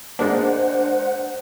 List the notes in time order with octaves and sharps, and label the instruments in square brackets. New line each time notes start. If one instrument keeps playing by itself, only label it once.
[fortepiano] G#3 A#3 [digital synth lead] D4 [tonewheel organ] C5 F#5